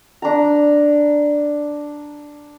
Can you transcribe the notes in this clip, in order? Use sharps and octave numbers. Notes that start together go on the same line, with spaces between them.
D4 A#5